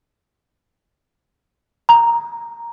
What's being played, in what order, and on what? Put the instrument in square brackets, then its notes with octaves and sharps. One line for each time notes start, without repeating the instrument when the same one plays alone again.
[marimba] A#5